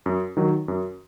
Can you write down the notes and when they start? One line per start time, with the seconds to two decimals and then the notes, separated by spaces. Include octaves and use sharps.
0.06 F#2
0.37 D#3 F#3
0.68 F#2